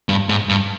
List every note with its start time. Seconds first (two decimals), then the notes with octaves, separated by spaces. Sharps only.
0.09 G2
0.29 G#2
0.49 G2